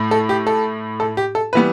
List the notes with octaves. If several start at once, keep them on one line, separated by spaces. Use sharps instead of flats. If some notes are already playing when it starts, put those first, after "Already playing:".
Already playing: A2 A3
A4
G4
A4
A4
G4
A4
E3 G3 B3 B4